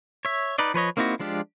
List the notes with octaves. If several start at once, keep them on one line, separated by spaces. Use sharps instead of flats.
C#5 E5
D#4 B4 D5 D#5
F3 B4 C#5 D#5
A#3 C4 D#4 E4 F#4
F3 G#3 D4 F4 G4